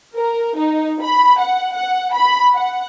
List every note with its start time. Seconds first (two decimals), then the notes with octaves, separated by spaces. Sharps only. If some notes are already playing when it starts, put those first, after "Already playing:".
0.15 A#4
0.57 D#4
1.01 B5
1.40 F#5
1.73 F#5
2.13 B5
2.54 F#5